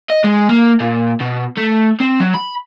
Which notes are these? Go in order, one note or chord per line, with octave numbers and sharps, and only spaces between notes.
D#5
G#3
A#3
A#2
B2
A3
C4
F#3
B5